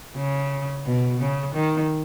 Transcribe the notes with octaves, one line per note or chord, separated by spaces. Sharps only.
C#3
B2
C#3
D#3